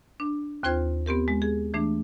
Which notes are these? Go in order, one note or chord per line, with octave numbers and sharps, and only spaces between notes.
D4
D#2 C4 F4 C5 G#6
B3 C4 G4 A#4
G#3
G#4
E3 A3 D4